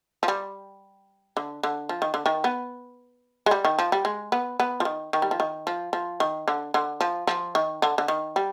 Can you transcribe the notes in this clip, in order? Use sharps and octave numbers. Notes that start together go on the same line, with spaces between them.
F3
G3
D3
D3
F3
D#3
D3
D#3
B3
G#3
G3
D#3
F3
G3
G#3
B3
B3
F3
D#3
D#3
G3
F3
D#3
F3
F3
D#3
D3
D3
F3
F3
D#3
D3
D3
D#3
G3